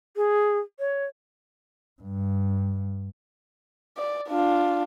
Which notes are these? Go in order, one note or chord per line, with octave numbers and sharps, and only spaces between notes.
G#4
C#5
G2
D5
D4 F4